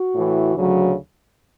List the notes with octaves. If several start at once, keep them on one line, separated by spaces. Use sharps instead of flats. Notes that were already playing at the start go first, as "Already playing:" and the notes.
Already playing: F#4
A2 E3
D2 C#3 F#3